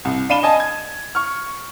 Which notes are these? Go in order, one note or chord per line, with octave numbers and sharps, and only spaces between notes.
C2
D4 F5 B5 D#7 E7 G7
D#5 G#5 A5
G#6
C#6 F6